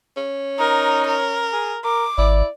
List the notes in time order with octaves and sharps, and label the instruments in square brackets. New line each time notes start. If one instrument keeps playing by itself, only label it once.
[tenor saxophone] C#4
[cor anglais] D#4 [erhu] A#4
[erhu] A#4
[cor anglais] G#4
[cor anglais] A#4 [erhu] D6
[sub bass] G#1 [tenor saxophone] E4 [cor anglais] D5